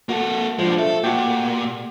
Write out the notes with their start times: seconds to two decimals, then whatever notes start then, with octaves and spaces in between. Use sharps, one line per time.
0.09 A#3 F#4 A4 F#5
0.59 F3 G#3 D4
0.78 A3 A4
1.03 A#2 F#4 G4